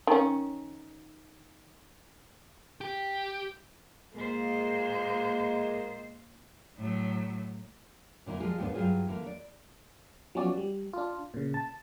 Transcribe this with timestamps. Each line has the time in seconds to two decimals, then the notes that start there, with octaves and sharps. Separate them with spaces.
0.07 D#3 C#4
2.81 G4
4.14 A#2 G#3 A#3 C5
6.77 A2 F#3
8.26 A#2 D3 A#3 E4
8.40 F3 G3 G#3 F4
8.59 D#2 G#2 B3 D4
8.74 G2 F#3 G#3 C#4 F4 G#4
9.06 D3 E3 A#3
9.26 D5
10.35 F3 F#3 B3 C#4 F#4 D5
10.57 G3
10.93 D4 F4
11.34 A#2 C#3
11.54 A5